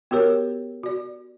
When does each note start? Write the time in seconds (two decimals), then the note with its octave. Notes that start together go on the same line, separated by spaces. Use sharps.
0.11 B3 F#4 G4 A#4 C#5
0.83 F#4 D5